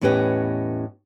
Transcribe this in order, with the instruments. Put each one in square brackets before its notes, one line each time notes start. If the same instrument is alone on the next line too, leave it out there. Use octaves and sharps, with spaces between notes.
[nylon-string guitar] E2 A2 C#4 G4 B4 D#5